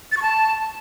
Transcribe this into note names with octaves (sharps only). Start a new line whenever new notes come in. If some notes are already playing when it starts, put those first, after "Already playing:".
A6
C#6
A5